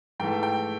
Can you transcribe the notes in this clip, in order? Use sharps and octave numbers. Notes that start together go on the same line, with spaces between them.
G#2 E3 A3 G5
G5